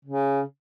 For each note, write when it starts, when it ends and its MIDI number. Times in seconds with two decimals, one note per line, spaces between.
0.05 0.41 49